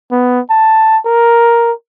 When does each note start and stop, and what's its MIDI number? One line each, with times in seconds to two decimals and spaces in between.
0.12 0.40 59
0.50 0.98 81
1.06 1.73 70